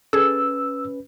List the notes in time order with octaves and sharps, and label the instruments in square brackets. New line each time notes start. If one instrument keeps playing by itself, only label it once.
[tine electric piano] C#4 B4 [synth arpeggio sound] G#4 A4 [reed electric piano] E6